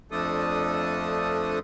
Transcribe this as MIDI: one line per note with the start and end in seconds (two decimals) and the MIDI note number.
0.11 1.59 41
0.11 1.59 53
0.11 1.59 57
0.11 1.59 62
0.11 1.59 69
0.11 1.59 87